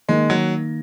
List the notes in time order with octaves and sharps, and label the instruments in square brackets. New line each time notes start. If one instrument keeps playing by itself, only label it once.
[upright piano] D#3 A#3 D#4 [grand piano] G#3
[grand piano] F#3